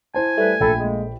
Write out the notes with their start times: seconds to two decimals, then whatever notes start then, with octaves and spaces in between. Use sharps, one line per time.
0.14 E4 C5 G#5 A5
0.38 G3 A3 B4
0.60 A#1 A4 G5 B5
0.79 G#3 A#3